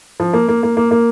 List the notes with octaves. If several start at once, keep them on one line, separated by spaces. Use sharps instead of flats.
F3
A#3
A#3
A#3
A#3
A#3